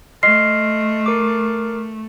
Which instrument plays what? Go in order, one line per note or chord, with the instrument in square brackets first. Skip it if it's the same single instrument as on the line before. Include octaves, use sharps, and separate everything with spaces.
[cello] A3 [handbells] D#5 C6 F6 [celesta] C7
[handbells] A#4 D6